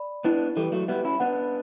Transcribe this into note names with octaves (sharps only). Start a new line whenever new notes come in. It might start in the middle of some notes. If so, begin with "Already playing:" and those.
Already playing: D5 B5
B3 D4 E4
E3 G3 A4
F#3 A3
G3 B3 E5
C#4 E4
B3 D4 F#5